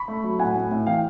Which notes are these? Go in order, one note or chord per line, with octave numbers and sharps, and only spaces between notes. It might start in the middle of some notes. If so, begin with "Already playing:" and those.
Already playing: B5 C#6
A3
F#3
A2 F#5 G#5
A2
A2
E3 F5 G5